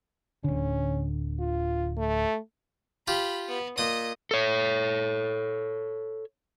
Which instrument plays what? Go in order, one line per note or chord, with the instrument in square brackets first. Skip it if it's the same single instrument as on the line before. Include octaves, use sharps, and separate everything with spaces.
[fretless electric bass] D1 D3 [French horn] C#4
[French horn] F4
A3
[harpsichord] F4 G4 [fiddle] B5
[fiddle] B3
[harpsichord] A#2 D#6 [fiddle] D#5
[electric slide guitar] A4 C#5